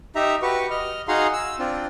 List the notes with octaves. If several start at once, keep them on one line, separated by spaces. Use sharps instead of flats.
D#4 G4 E5 A#5
F#4 G4 B4 C#6
D#5 F6
D#4 F#4 G#4 F5 A#5 C6
E6
C4 D4 F4